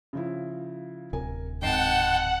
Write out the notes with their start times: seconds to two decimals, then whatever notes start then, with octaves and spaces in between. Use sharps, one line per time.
0.13 C#3 F3 E4
1.13 D1 C3 A#4 G#5
1.62 G#1 D#5 F#5 G5 A5 C7